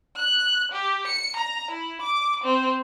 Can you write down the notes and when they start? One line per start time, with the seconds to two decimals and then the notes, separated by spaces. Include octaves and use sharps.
0.15 F#6
0.72 G4
1.07 C#7
1.36 A#5
1.71 E4
2.02 D6
2.44 C4